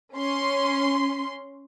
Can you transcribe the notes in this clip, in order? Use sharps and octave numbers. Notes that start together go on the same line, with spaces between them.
C#4 C6